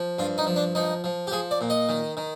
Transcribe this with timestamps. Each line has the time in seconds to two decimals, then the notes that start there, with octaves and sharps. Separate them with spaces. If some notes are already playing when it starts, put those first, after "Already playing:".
Already playing: F3
0.19 G2 F4
0.38 D#4
0.46 F3
0.56 D4
0.75 F3 D#4
1.04 F3
1.27 G4
1.32 F3 G#4
1.51 D5
1.61 A#2
1.70 D#5
1.89 D#3
2.17 D#3